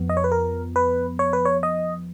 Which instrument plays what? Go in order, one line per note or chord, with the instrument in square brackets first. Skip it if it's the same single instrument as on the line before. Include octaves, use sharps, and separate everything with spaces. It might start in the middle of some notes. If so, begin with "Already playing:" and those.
Already playing: [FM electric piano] F2 F3 B3
D#5
C#5
B4
A#4
B4
C#5
B4
C#5
D#5